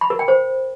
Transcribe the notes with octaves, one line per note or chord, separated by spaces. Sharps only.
B5
A#4
G5
C5